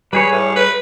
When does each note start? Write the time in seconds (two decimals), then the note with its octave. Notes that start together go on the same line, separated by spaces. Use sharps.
0.13 G3 G#4 B4 C#5
0.32 A2
0.56 B4